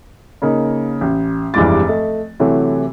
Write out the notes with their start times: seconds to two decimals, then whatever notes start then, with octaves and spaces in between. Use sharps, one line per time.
0.42 C#3 A#3 D#4
1.01 A1
1.54 F1 G2 E3 G#3 D6 A6
1.88 A3 D#5
2.40 C3 E3 F#3 A3